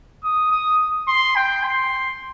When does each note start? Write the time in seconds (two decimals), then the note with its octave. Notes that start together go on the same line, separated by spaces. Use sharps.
0.23 D#6
0.51 D#6
1.08 C6
1.36 G5
1.64 C6